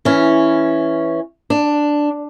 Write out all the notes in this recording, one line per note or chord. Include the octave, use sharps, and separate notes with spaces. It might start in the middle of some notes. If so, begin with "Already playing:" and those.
E3 C#4
D4